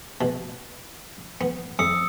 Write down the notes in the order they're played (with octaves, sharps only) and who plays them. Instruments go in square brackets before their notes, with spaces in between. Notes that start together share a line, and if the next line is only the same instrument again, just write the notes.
[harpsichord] B2
B3
[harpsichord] F2 [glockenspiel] D#6 E6 C#7